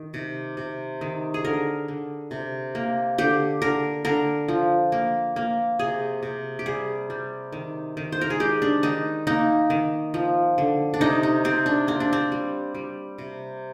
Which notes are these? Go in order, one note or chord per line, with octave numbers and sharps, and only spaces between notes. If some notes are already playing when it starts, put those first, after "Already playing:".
Already playing: D#3
C3
C3
D#3
G#4
D3 A#4
D3
C3
A#3
D3 G4
D3 A#4
D3 A#4
F3
A#3
A#3
C3 G#4
C3
G4
G3 G#4
G3
D#3
D#3
C5
A#4
G#4
G#3 G4
D4
D#3 D#4
A#3 D#4
D#3
F3
D3
D4
C3 D#4
D#4
C3 C4
D4
A#3 C4
D4
C4
G3
G3
C3